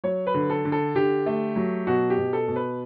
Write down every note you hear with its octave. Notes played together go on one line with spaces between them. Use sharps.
F#3 C#5
B4
D3
A4
D3
A4
D3 G4
A3
F#3
B2 F#4
G4
B2
A4
B2
B4